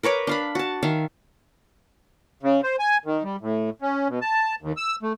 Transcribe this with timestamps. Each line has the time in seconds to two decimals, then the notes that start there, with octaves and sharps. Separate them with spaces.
0.03 A#4 B4 C#5 D6
0.27 D4 F5 B5
0.55 F#4 A5
0.83 D#3 E5 F5
2.43 C#3
2.63 C5
2.79 G#5
3.06 D#3
3.23 G3
3.41 A2
3.82 C#4
4.09 B2
4.21 A5
4.62 D#2
4.77 E6
5.03 A3